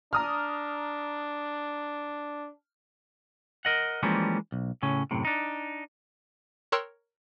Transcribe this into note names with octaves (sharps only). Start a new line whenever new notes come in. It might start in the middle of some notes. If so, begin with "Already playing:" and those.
D4 A#5 D#6 F6
A#4 D#5 F#5
E3 F3 G3 G#3 A#3 C#4
B1
A2 C#3 C#4
F#2 A2 C3
D4 D#4
A#4 C#5 G5 C6 E6 F#6